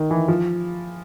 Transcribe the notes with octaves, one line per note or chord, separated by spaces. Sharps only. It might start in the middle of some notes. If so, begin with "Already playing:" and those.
Already playing: D#3
E3
F3